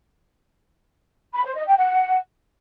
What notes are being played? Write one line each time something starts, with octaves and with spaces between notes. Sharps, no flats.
B5
C5
D#5
G5
F#5